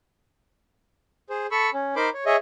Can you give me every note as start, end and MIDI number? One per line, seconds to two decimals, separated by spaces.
1.30 1.47 68
1.30 1.47 72
1.51 1.70 69
1.51 1.70 83
1.51 1.70 85
1.51 1.70 88
1.74 1.95 61
1.96 2.10 63
1.96 2.10 70
1.96 2.10 72
1.96 2.10 83
1.96 2.10 84
1.96 2.10 86
2.14 2.24 73
2.26 2.36 68
2.26 2.36 73
2.26 2.36 75
2.26 2.36 76